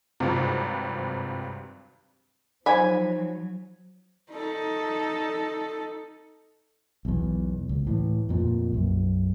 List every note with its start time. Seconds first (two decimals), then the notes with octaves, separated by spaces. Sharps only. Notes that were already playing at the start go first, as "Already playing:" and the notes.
0.20 G#1 G2 C3 F#3 G#3 F4
2.66 F3 F#3 D#4 C5 G#5 B5 G#6
4.32 D#4 A4
7.05 B1 E2
7.69 C#2
7.87 A2 E3
8.29 F2 A#2
8.72 B1 F#2